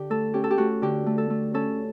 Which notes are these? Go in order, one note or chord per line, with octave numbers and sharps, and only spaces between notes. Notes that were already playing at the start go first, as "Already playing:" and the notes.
Already playing: D3 G4
A3 A4
C#4 G4
A4
G4
A3 F#4
D3 G4
A3
A4
A3
C#4 A4